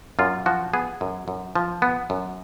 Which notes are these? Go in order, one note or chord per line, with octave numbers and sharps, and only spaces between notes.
F#2 F4
F3 F#4
B3 G#4
F#2
F#2
F3
B3
F#2